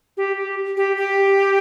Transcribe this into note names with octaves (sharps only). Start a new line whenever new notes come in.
G4
G4
G4
G4